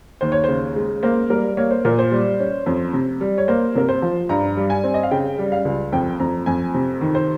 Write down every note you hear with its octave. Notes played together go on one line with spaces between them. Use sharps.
D#2 C5
C#5
C#3 C5
G#3
A#3 C5
G3 A#4
A#3 C#5
C5
A#2 A#4
C5
G3
C#4
F2
C3
G3
C#5
A#3 C5
C3 A#4
C5
F3
G2 A#5
G3
G#5
C4
D#5
F5
C#3 G5
G3
F5
C#2
F2 G5
F2 A#5
F2 G#5
C3
D#3
C5